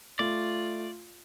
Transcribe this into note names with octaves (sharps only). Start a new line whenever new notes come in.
A3 F4 D5